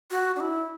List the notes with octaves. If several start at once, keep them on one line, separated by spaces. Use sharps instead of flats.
F#4
D4
E4